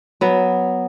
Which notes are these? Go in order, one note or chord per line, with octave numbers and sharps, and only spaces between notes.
F#3 B3